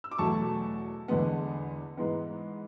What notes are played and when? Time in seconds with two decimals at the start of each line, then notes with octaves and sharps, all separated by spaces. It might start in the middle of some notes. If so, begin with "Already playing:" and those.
0.04 E6
0.11 D6
0.18 E2 B2 F#3 A3 A5 C#6
1.08 E2 D3 G#3 B3
1.97 G#2 E3 G#3 B3